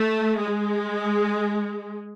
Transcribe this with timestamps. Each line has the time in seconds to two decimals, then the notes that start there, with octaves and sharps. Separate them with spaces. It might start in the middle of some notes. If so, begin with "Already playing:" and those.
Already playing: A3
0.39 G#3